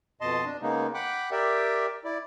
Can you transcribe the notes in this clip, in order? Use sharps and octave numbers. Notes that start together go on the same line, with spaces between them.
F2 B2 D#5 A5 C6
D4
C#3 G#3 A#3 B3 D#4
F#5 G5 B5 D6 F#6
G4 A#4 D5 E5 G5
E4 D5